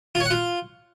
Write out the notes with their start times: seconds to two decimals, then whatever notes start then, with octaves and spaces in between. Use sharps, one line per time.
0.15 F4
0.20 C#5
0.25 F#5
0.31 F4